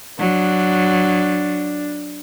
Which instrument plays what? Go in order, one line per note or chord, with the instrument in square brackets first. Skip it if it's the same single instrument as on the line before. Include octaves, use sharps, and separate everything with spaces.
[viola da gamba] F#3 [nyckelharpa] D4